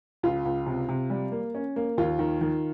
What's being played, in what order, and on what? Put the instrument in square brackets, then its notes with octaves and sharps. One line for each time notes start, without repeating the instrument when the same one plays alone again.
[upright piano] C#2 F4
C#2
C3
C3
G3
A#3
C#4
A#3
D#2 F4
D#3
D#3